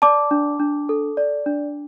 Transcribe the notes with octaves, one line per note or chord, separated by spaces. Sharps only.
D5 A5 D6
D4
D4
A4
D5
D4